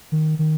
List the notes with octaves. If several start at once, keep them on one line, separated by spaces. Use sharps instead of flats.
D#3
D#3